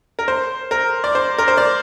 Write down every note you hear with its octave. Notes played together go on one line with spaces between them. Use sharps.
A#4
C5
A#4
D5
C5
A#4
C5
D5